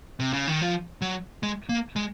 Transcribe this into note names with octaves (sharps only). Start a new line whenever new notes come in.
C3
C#3
D#3
F3
F#3
G#3
A#3
G#3